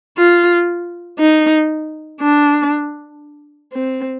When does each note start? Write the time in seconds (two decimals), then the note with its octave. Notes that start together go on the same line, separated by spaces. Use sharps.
0.18 F4
1.20 D#4
2.21 D4
3.74 C4